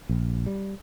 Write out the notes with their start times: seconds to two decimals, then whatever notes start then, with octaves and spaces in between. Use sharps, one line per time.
0.09 A#1
0.46 G3